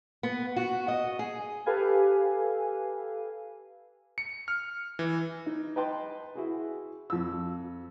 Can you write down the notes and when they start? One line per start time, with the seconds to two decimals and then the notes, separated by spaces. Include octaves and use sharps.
0.23 B3
0.56 F#4
0.88 D#5
1.19 G#4
1.66 G4 A4 B4 F5 G#5
4.18 C#7
4.48 F6
4.99 E3
5.46 D#4
5.76 B4 D#5 G5 A5 C6
6.35 E4 F#4 G#4
7.10 F2 E6